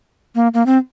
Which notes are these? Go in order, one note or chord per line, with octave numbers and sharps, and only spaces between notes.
A#3
A#3
C4